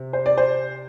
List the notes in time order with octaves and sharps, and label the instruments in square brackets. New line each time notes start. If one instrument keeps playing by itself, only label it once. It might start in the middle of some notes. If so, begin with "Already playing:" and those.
Already playing: [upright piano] C3
C5
D5
C5